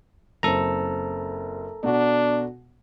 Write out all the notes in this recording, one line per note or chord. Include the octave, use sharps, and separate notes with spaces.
F#1 C4 A4 A#5
B2 D4 F#4